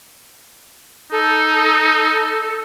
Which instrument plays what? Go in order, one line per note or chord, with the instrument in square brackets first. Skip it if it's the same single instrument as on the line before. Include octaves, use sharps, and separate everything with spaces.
[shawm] D#4 [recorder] A4